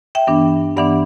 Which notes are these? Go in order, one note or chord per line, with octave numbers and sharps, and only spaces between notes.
E5 G5
G2 E3 B3 D4
G2 E3 B3 D4 D5 F#5